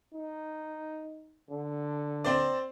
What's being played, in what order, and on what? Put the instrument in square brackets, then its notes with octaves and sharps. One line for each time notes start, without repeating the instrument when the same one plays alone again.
[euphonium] D#4
D3
[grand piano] C4 C5 D5